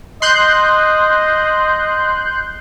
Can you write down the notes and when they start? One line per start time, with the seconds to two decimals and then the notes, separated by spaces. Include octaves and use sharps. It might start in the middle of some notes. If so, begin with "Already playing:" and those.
0.22 D#5 C6 F#6 G6